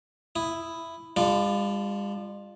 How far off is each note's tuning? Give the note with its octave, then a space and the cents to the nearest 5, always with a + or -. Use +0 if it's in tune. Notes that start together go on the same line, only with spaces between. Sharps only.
E4 +5 D#6 +0
G3 +45 D4 +0 F4 +0